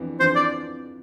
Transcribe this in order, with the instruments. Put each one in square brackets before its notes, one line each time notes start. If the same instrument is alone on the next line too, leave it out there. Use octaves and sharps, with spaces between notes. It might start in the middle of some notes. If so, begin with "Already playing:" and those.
Already playing: [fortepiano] F2 E3 B3 D4
[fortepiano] F2 E3 B3 D4 [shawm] C5
[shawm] D5